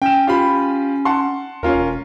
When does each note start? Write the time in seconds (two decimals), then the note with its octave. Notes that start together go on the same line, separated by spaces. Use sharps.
0.02 C#4 G5 E7
0.27 F4 G4 B5
1.05 F#5 A5 C6
1.63 D#2 C#4 F4 A#4
1.75 E1